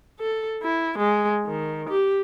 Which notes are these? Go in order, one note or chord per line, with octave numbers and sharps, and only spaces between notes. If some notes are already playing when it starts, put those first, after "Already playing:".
A4
E4
G#3
D#3
G4